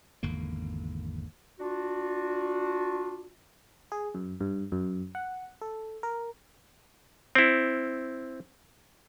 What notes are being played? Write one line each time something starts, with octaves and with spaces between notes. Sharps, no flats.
G#1 E2 D3 A#3
D4 F4 F#4
G#4
F#2
G2
F#2
F#5
A4
A#4
C4 E4